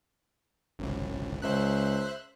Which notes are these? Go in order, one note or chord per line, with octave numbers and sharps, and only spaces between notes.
G1 C2 F#2
C#2 C5 E5 F#6